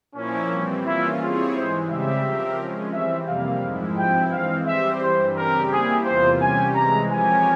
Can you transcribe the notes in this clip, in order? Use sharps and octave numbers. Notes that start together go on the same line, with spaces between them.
A#2 F3 A#3 C#4 E4
E3 G3 C4
E3 A#3 C#4 E4 F4
G3 C4 E4 F4 G#4 C#5
G#2 E3 G#3 C5
C#3 G3 C4 G4 E5
F3 C4 G4 A#4
F3 G#3 C#4
E3 G3 C4 E5
F2 C3 G3 A#3 F5
G#2 F3 G#3 E4
G2 F3 C4 E4 G5
E3 G#3 C4 F5
G3 C4 G4 C5 E5
G2 E3 G3 C5
C#3 G3 C4 G4 A#4
G3 A#3 E4 G4 G#4
E2 C3 E3 A#3 F4 C5
C3 G3 C#4 G4 G#5
C3 E3 G#3 A#5
F3 C4 G4 A#4 C#5 G#5